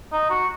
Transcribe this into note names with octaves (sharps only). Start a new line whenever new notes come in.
D#4
F#4